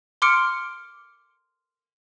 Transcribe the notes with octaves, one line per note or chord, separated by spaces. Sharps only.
C6 D6 F6 C#7 D7